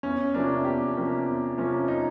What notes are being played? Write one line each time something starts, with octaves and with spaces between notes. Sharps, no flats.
E2 C#4
C3 F3 A#3 C#4 D4
E2 G4
C3 F3 A#3 C#4
E2
C3 F3 A#3 C#4
D#4